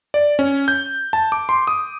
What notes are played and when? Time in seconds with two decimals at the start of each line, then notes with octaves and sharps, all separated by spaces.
0.14 D5
0.39 C#4
0.68 G6
1.13 A5
1.32 D6
1.49 C6
1.67 D#6